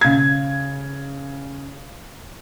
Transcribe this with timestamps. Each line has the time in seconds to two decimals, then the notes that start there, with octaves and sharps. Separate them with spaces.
0.01 C#3 G#6